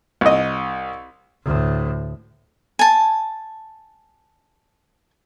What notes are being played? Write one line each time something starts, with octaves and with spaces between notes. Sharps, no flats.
C2 D#5
D2 A2
G#5 A5